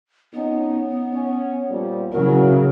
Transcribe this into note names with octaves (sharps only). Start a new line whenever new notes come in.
F2 B3 C#4 D#4
C#4
A#2 F3 G3
C#3 F#3 E4 F#4 A#4